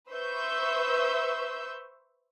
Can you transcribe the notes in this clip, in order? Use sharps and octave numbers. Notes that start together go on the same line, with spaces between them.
B4 C5 E5 C#6 E6 G6